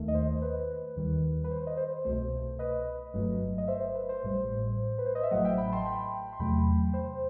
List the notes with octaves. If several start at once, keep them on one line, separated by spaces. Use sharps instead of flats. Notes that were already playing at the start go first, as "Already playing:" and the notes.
Already playing: D#2 D#3 A3
D#5
C5
B4
D#2 D#3 G3
B4
C5
D#5
C5
C2 B2 A3 C5
B4 D#5
G1 G2 F#3 A3
D#5
C5 E5
B4
C5
A1 A2 G3
B4
C5
D#5
E5
A1 A2 F#3 A3 D#5 F#5
E5 G5
G5 B5
A5 C6
G5 B5
C6
E2 C3 F#3 A3 G5 B5
C5